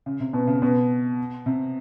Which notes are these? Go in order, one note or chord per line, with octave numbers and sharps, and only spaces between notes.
C#3
C3
B2
C#3
B2
C3